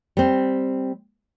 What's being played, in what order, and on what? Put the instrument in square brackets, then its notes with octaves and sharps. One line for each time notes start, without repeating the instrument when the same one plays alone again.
[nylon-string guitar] G3 C4